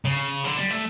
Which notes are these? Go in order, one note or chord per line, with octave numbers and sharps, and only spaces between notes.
C#3
D3
G3
A3